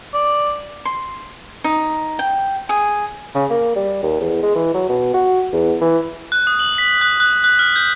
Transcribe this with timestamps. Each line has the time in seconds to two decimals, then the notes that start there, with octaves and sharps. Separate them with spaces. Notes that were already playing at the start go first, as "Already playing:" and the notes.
0.14 D5
0.85 C6
1.64 D#4
2.19 G5
2.69 G#4
3.35 C#3
3.51 A#3
3.76 G3
4.03 D#2
4.21 E2
4.43 G#3
4.55 E3
4.74 F#3
4.89 B2
5.14 F#4
5.53 E2
5.81 E3
6.32 F#6
6.47 D#6
6.59 F#7
6.78 B6
7.01 F#6
7.20 F#6
7.44 F#6
7.59 F6
7.76 G6